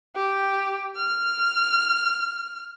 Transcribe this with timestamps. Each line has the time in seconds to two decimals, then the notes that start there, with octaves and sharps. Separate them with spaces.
0.16 G4
0.96 F6